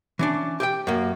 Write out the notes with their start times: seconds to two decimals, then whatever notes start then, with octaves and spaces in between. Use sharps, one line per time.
0.19 E3 C#4 D4
0.60 G4 E5 G5
0.87 F#2 A#3